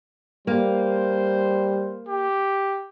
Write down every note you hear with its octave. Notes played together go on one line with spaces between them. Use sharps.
G3 A#3 C5
G4